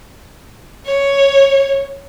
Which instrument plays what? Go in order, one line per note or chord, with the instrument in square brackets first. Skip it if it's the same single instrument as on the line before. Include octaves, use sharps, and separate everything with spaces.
[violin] C#5